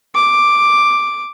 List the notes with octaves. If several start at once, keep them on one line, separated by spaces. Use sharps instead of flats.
D6